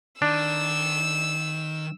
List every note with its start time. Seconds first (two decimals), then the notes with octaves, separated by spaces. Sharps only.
0.22 D#3 D4 E6